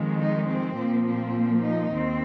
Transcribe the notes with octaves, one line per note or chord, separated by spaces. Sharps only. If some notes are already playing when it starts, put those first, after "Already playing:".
Already playing: F2 D#3 G#3
D#4
C4
A#2 F3 A#3
C4
D#4
D#2 D#3 C4